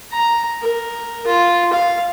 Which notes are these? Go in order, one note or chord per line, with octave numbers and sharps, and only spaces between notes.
A#5
A#4
F4
F5